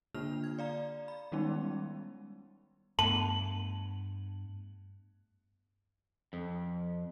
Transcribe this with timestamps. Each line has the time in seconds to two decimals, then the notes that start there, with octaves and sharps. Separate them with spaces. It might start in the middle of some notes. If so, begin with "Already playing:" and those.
0.14 D3 A#3 D4 F4 F6 F7
0.44 G#6
0.59 D5 F5 A#5
1.08 B5
1.32 D#3 G3 G#3 B3 C#4 D#4
2.99 G2 A3 B3 A5 F#7
6.33 F2